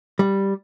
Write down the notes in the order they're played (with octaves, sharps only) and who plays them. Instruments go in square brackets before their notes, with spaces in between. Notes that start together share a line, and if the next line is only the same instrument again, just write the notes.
[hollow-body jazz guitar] G3